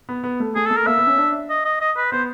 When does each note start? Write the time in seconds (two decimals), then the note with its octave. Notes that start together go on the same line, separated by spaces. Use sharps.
0.09 B3
0.24 B3
0.40 A3
0.55 A3 G#4
0.66 A4
0.71 A3
0.76 A#4
0.87 A#3 E5
0.98 B3
1.07 C#4
1.18 D4
1.50 D#5
1.65 D#5
1.81 D#5
1.97 B4
2.12 B3 C5